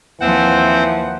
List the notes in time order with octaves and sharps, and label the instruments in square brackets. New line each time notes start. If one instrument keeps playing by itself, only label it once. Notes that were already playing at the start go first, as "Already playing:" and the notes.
[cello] D#2 F3 [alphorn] E3 [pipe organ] C4 C5 [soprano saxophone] F#5